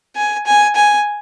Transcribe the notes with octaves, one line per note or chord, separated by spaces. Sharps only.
G#5
G#5
G#5